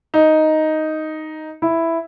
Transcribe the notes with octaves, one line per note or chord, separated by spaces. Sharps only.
D#4
E4